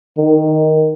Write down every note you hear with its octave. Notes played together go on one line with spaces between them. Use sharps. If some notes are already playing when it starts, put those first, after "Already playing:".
D#3